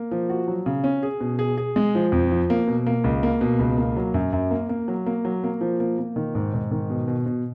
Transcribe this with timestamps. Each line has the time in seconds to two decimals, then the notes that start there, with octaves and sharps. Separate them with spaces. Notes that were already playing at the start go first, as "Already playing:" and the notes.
Already playing: A#3
0.11 F3
0.29 F#4
0.48 F#3
0.66 C#3
0.84 C#4
1.03 G#4
1.21 B2
1.39 G#4
1.57 G#4
1.76 G#3
1.95 F3
2.12 F2
2.31 F3
2.50 A#3
2.67 B2
2.86 A#3
3.04 C#2
3.23 A#3
3.41 B2
3.59 C#2
3.77 A#3
3.97 F#3
4.14 F#2
4.32 F#2
4.51 A#3
4.69 A#3
4.88 F#3
5.06 A#3
5.25 F#3
5.44 A#3
5.61 F3
5.80 A#3
5.99 A#3
6.16 D#3
6.35 G#2
6.54 G#2
6.71 D#3
6.90 B2
7.08 B2
7.26 B2